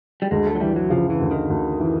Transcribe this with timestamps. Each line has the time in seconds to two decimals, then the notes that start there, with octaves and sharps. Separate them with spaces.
0.22 G3
0.31 D2 G#3
0.46 A3
0.55 F#3
0.60 E3 G3
0.76 F#3
0.90 C#3 F3
1.10 E3
1.20 D2
1.31 D#3
1.50 D2
1.80 E3